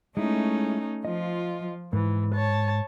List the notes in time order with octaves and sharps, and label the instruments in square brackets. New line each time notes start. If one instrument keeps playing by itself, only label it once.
[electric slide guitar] G#3 E4 [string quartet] A3 C#4 D#4
[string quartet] F3 F4 [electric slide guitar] D#5
[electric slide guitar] G#2 [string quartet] E3
[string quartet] C#5 A5